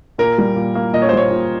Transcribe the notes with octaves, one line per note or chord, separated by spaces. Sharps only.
A#2 A#4
G3
A#2
A#3
A#2 D#5
C#5
C5
G3 C#5
A#2